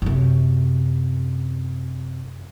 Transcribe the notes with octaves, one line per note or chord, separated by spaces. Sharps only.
F#2 C3